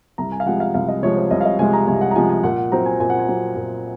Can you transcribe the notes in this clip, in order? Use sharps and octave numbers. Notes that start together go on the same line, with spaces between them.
C2 A#5
G#5
F5
C3 F3 G#3 F#5
F5
C2 F5
D#5
C3 F3 G#3 C#5
C5
C2 D#5
F5
D#5
C3 F3 G#3 G#5
A#5
C2 G#5
F#5
A#5
C3 F3 G#3 G#5
G#5
A#2 F#5
F#5
F#3 C4 A#5
G#5
A#2 G#5
F#5
G#5
F#3 C4
A#2